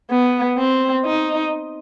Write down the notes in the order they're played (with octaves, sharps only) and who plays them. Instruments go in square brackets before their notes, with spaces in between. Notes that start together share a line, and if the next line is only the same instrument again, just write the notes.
[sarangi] B3
C4
D#4